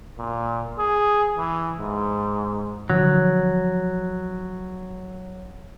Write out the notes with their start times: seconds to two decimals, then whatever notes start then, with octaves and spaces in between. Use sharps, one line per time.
0.18 A#2
0.78 G#4
1.37 E3
1.79 G#2
2.90 D3 F3 F#3